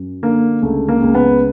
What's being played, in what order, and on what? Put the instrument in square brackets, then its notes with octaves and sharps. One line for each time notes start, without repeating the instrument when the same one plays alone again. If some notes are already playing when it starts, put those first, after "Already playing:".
Already playing: [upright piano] F#2
D3 A#3
C#2 A3
A#3
C#2
B3